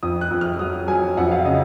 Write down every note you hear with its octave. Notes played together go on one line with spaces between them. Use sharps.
F2 D#6
F#6
F2
F6
F#3 D#6
F#3 G#5
F2 F#5
F5
C#3 D#5